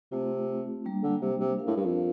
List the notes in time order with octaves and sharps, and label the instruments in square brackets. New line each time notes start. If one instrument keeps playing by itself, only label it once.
[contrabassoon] C3 [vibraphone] A3 C4 F4
[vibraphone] G3 A#3 D4
[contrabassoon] D3
C3
C3
[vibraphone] D4 F4 A#4 F5
[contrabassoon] A2
G2
F2